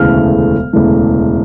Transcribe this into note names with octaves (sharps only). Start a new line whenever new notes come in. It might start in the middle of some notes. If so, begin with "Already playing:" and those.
Already playing: E1 D2 C#3 E3 A3 F6
E1 D2 C#3 E3 A3